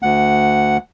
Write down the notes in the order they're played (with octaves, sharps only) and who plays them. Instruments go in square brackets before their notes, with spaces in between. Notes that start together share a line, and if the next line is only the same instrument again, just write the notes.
[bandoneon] D2 F#5